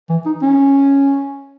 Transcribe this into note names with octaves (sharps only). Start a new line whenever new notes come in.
E3
D#4
C#4